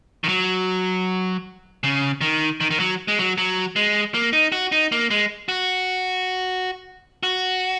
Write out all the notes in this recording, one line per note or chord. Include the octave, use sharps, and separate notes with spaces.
D#3
F#3
C#3
D#3
D#3
D#3
F#3
G#3
F#3
F#3
G#3
A#3
D#4
F#4
D#4
A#3
G#3
F#4
F#4